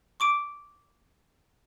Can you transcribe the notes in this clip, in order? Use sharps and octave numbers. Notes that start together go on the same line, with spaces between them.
C#6 D6 D7